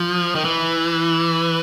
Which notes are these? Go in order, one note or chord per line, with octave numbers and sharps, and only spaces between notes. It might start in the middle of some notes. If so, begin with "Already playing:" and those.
Already playing: F3
D#3
E3